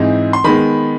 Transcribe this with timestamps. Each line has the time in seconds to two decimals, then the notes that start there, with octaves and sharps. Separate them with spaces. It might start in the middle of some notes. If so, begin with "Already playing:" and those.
Already playing: G#2 E3 G#3 C4 D#4
0.33 C6
0.44 D#3 G#3 B3 B5